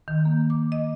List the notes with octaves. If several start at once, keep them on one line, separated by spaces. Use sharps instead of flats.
D#3
A#3
D6
D#5